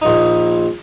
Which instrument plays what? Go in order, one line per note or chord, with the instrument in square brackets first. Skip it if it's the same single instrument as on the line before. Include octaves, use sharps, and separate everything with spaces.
[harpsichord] A#1 D#4